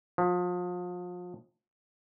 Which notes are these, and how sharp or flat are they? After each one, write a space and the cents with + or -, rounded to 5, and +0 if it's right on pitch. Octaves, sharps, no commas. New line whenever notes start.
F3 +35